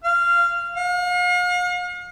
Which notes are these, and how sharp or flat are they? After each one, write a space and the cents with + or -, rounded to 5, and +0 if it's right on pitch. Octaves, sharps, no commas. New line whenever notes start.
F5 -15
F5 +45